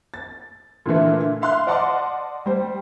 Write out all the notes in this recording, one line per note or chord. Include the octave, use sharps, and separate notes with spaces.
A6
A#2 D3 E3 A3
E5 F5 C6 F6 F#6
D5 D#5 F#5 A5 C6 D6
G3 C5